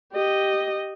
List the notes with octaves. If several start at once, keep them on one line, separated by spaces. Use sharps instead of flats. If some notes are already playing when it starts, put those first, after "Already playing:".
G4 D#5